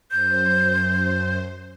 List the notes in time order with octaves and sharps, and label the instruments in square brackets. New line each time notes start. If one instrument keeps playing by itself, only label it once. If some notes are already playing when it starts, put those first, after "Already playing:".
[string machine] F#2 C5 [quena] G6